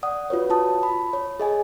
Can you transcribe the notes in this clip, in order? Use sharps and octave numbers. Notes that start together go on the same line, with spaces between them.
D5 F#5 D#6
F4 F#4 B4 C#5
F4 A5 D#6
B5
C#5
G#4 D#5 G#5